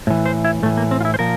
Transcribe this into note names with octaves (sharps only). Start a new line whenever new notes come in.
A2 E3
C5
E4
A2 E3 A3
A#3
C4
F4
E4
C5
A#2 F3 A#4